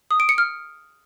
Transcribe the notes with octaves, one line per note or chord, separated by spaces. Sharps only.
D#6
D7
C#7
F6